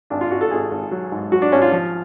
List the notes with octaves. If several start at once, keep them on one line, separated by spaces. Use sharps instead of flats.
G#1 D4
F4
G#1 F#4
A4
G#1 G#4
G#1
F#3
G#2
F#3 F#4
D4
G#1 C#4
F4
F3